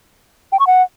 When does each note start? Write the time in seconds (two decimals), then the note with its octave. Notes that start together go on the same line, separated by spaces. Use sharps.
0.52 G5
0.60 C#6
0.67 F#5